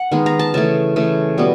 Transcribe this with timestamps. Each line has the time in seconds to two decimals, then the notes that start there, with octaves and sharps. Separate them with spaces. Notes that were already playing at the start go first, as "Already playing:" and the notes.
Already playing: F#5
0.11 D#3 G#3 B3
0.26 A#5
0.39 A5
0.54 C#3 E3 A3 A5
0.96 C#3 E3 A3
1.38 B2 G3 B3